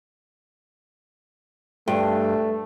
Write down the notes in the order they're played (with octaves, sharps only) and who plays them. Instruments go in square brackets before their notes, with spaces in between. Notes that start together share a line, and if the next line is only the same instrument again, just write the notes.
[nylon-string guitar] G2 [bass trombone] A3